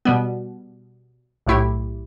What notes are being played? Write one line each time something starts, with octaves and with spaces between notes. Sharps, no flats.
B2 G3 B3
B1 A2 A3 E4 G4